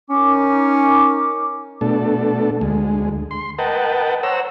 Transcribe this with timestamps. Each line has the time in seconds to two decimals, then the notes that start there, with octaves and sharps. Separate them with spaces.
0.10 C#4 D#4 A#4 D6
1.81 B2 A3 D4 A4
2.61 D2 G#3
3.31 C6
3.59 A#4 B4 D#5 F#5 G5 A5
4.23 C5 C#5 F#5 A#5 E6